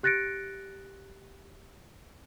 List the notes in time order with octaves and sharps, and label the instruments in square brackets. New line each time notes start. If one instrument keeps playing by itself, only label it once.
[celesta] G4 F#6 A6 A#6 C#7 D7